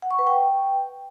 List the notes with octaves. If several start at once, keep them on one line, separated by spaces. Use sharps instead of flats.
F#5
C#6
B4
G5